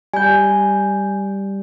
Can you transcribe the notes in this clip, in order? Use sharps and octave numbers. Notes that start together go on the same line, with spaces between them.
G3 G#5 G6